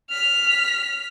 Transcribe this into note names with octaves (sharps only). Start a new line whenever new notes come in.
F6 B6